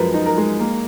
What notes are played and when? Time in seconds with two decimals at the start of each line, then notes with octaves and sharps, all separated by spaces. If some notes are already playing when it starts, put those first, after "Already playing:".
Already playing: F#2 F3 G#3 A#4 B4
0.14 D#4
0.26 A#4
0.37 G#3
0.59 A#3